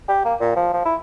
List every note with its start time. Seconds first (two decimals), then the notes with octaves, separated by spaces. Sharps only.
0.08 G4
0.25 A#3
0.40 A#2
0.56 F3
0.73 F3
0.85 E4